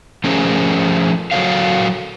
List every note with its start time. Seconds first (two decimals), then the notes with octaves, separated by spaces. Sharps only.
0.24 F3 A3 C#4 G#4 A#4 C5
1.31 F#3 F#4 A4 A#4 C#5 F5